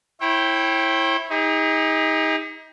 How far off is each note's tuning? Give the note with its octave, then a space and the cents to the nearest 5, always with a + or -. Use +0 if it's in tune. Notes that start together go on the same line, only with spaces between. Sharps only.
E4 +0 C#5 -45 G5 +0
D#4 +30 G#4 -40